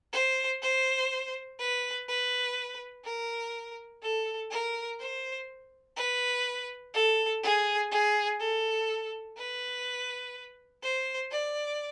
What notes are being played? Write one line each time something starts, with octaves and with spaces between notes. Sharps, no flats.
C5
C5
B4
B4
A#4
A4
A#4
C5
B4
A4
G#4
G#4
A4
B4
C5
D5